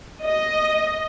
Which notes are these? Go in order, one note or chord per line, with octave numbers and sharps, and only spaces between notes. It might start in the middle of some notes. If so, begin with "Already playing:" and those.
D#5